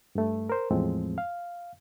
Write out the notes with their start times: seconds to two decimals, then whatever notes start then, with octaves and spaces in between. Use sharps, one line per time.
0.15 G2 A3
0.49 A#4 C5
0.71 E2 A2 F3 G#3 C4
1.18 F5